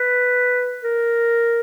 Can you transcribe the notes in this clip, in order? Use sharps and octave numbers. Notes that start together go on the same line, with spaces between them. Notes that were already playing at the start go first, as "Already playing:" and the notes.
Already playing: B4
A#4